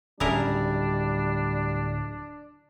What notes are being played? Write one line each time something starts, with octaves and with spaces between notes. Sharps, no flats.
D1 C#3 G3 D4 E4 A#4